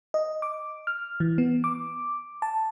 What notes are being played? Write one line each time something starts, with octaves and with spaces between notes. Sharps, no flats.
D#5
D6
F6
E3
B3
D6
A5